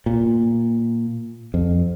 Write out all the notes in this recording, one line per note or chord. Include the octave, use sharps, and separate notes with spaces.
A#2
F2